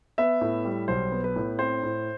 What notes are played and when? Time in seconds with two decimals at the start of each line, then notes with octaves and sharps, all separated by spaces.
0.18 B3 E5
0.41 A2
0.65 G3
0.88 B1 C5
1.12 B3
1.24 B4
1.36 A2
1.59 C4 C5
1.83 A2